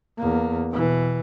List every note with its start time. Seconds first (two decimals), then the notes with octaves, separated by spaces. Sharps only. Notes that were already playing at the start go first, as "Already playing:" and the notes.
0.18 E2 A#3
0.71 B2 E3